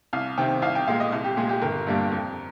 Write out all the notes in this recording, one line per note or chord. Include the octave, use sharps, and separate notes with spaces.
C2 F5
C3 D#3 G5
C2 F5
G5
A#2 G#3 F5
D#5
C2
G4
A#2 G#3 G#4
G4
G1 A#4
G2 G3 A#3
F2